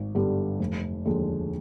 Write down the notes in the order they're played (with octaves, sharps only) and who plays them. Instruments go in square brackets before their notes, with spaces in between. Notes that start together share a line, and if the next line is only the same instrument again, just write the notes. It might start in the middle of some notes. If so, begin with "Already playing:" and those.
Already playing: [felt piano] G#1
G2 D3 G3 B3
F1
D#2 D3 F3 G#3